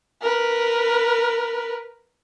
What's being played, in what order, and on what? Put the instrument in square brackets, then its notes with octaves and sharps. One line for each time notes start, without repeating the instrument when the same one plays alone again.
[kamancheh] A#4 B4